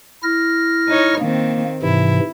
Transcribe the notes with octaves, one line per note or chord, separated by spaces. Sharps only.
E4 F6 A#6
D#4 C#5
D#3 A#3 C4
G#2 C3 E3 E4